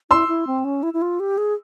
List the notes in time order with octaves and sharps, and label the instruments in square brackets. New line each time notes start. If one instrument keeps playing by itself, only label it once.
[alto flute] E4 [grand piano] C6 E6
[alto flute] E4
C4
C#4
E4
E4
F4
G4
G#4